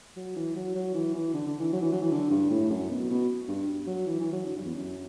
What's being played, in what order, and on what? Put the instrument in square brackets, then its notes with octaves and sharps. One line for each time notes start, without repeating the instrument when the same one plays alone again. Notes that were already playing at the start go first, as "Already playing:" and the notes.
[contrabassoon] F#3
E3
F#3
F#3
E3
E3
D3
D3
E3
F#3
E3
F#3
E3
D3
G2
A2
F#2
B2
B2
G2
F#3
E3
E3
F#3
D3
G2
E2
F#2